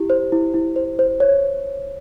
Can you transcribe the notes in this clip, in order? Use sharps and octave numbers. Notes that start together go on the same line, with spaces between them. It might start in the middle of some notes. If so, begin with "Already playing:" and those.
Already playing: E4 G4
C5
E4
E4
C5
C5
C#5